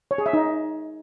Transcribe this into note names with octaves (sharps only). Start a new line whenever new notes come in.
C#5
G#4
E5
D#4